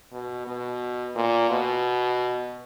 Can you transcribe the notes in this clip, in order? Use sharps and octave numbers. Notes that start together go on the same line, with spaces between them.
B2
B2
A#2
B2